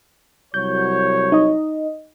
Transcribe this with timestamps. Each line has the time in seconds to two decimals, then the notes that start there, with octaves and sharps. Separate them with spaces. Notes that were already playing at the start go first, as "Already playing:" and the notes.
0.54 C2 F#3 C#5 G6
1.32 D#4 D#5